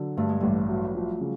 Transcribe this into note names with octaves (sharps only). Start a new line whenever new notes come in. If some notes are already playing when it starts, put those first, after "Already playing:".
Already playing: D3 F#3
G2 A3
G#3
A1 G3 A3
F#3
F3
C#3